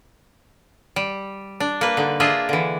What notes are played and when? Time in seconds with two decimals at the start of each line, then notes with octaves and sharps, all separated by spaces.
0.96 G3
1.60 D4
1.81 A#3 B4
1.97 D3 D#4
2.20 D4 F4 G#4 D#5 E5
2.49 D3 E3